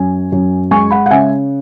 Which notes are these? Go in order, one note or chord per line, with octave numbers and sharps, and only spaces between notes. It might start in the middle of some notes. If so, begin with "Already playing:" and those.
Already playing: F#2 G#5
F#2
G#3 G#5 C#6
F#5 B5
F#5
C#3 E5 G#5